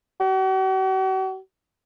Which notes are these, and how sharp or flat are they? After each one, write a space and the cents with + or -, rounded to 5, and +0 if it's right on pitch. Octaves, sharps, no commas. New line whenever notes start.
F#4 +45